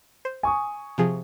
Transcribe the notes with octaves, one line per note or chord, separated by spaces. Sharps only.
C5
G#5 C#6 D#6
C3 F3 G#4